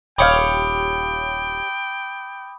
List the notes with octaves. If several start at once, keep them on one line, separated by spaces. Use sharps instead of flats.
D#1 G4 C#5 F5 G5 B5 D6 D#6